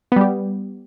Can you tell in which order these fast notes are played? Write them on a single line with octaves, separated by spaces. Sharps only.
B3 G3 G4